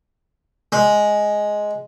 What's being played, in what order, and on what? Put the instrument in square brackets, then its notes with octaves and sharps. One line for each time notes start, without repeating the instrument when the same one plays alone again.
[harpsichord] G#3